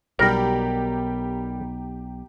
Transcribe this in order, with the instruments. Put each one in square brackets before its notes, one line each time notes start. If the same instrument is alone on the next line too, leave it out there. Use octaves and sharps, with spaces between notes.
[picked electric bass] B1 B2 [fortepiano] G3 [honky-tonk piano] G4 A#5 [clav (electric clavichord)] A#4